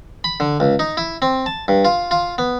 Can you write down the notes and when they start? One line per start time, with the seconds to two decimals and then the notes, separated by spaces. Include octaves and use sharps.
0.24 B5
0.40 D3
0.60 C#2
0.79 D#4
0.97 E4
1.22 C4
1.46 A5
1.68 G2
1.85 F4
2.11 F4
2.38 B3